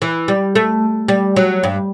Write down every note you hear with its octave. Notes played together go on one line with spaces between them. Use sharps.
E3
G3
A3
G3
F#3
G2